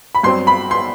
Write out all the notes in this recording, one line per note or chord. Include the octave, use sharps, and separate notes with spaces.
B5
G2 F#3 C4 C6
B5
C6